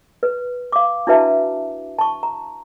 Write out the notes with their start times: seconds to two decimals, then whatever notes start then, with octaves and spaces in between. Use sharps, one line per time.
0.23 B4
0.72 F5 D6
1.07 D4 E4 F#4 B4 E5 A5
1.99 A5 C#6
2.23 A#5